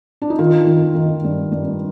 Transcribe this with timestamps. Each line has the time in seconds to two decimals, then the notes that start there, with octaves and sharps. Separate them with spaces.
0.22 D4
0.30 D#4
0.39 D#3 F4
0.67 D#3
0.95 D#3
1.24 G2
1.52 G2